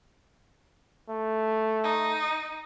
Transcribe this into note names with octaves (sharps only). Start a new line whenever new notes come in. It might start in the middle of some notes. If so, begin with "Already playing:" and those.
A3
D#4